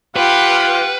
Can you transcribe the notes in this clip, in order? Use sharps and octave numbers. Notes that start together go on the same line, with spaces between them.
F4 G4 B4 F#5 F6